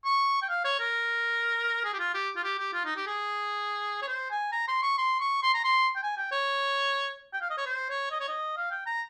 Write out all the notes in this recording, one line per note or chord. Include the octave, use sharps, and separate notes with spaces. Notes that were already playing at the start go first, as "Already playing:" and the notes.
C#6
G5
F5
C#5
A#4
G#4
G4
F4
G4
F4
G4
G4
F4
D#4
G4
G#4
C#5
C5
G#5
A#5
C6
C#6
C6
C#6
C6
A#5
C6
G5
G#5
G5
C#5
G5
F5
D#5
C#5
C5
C#5
D#5
C#5
D#5
F5
G5
A#5